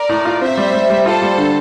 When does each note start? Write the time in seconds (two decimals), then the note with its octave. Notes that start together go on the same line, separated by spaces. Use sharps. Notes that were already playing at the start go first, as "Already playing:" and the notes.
Already playing: A#4 D5
0.09 A2
0.25 F4
0.41 C4 C5 E5
0.57 G3
0.74 G3
0.90 G3
1.05 F4 A4 C5
1.22 G3
1.38 D3